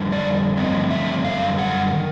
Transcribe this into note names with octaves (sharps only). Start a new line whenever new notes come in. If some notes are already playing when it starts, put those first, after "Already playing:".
Already playing: F2 D3 G3
D5
G2 D3 F3 A3 C4 D#5
E5
F#2 D3 G3 F5
F#5
D#3